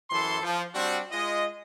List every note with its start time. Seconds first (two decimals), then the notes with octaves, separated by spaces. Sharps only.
0.10 F#2 E3 A4 C6
0.42 F3
0.74 G3 C4 D4 F#4
1.11 G#3 F4 D#5